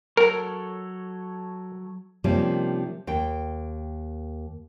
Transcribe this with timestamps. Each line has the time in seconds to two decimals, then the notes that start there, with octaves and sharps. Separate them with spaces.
0.17 F#3 A4 A#4 C#5
2.24 C3 D#3 F3 G3 A#3 C#4
3.07 D#2 G5